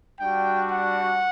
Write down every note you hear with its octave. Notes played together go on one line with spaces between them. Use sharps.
G3 D4 F#4 G5
F#5